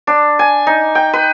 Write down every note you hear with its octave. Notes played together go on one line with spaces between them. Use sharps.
D4
G#5
D#4
G5
B4